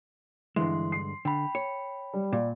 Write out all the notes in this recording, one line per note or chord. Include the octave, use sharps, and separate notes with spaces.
G2 D3 E3 G#3 C6
C7
D3 G5 B5
C#5
G3
A#2 D5